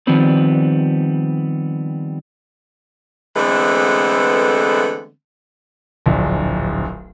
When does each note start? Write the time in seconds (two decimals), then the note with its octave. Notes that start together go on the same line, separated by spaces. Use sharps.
0.07 D#3 F3 G3 B3 C4 B4
3.36 D3 E3 G#3 A3 B3 C4
6.06 D1 A#1